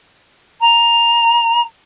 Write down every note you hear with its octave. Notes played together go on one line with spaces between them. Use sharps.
A#5